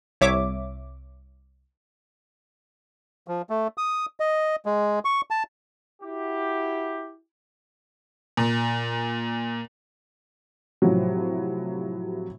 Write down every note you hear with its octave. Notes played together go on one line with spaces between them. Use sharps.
C2 C#5 E5 D6
F3
A3
D#6
D#5
G#3
C#6
A5
E4 F#4 G4
A#2
A2 C3 F3 F#3